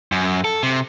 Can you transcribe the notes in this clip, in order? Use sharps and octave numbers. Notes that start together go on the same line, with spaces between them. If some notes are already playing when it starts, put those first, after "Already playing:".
F#2
A4
C3